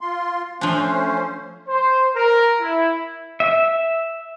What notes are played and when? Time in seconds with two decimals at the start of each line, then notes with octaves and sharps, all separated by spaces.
0.01 F4 C6
0.61 F3 A3 C#4 D4 C5
1.69 C5
2.15 A#4
2.61 E4
3.40 E5